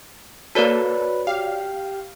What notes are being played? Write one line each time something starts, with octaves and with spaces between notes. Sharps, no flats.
A#3 F#4 A4 B4 C#5 D5
G4 F5